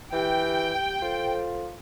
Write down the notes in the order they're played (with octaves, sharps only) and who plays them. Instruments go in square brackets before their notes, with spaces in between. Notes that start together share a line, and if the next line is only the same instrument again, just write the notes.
[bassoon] E3 [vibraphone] G4 [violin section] G5
[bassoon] F4 [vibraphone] A4 C5